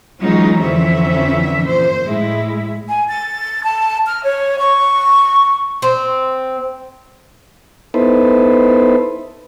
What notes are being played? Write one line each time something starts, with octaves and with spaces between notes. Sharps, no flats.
E3 F#3 G#3 C#4 D#4 F4
F2 D3 E3 C4 C#4 E5
A#2 C5
A2 G#3 E4
G#5
A6
A5
F6
C#5
C#6
C4
B3 D#4 E4 A4 B4 C5